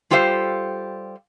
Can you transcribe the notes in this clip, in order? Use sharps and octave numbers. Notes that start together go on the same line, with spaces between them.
G3 F4 G4 A4 C5 F5